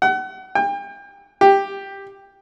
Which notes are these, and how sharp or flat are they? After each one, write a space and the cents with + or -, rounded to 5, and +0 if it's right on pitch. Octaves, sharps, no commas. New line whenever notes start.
F#5 +35
G5 +35
G4 +5